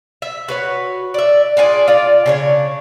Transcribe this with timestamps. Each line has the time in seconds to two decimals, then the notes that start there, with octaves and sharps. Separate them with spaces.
0.22 E5
0.48 F#4 B4 C#5
1.14 D5 E5
1.57 D4 F4 G#4 D5
1.88 F4 D5
2.26 C#3 D4 C#5